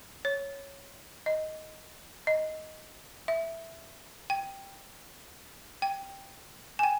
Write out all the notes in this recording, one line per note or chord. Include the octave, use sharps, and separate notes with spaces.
C#5
D#5
D#5
E5
G5
G5
G#5
G5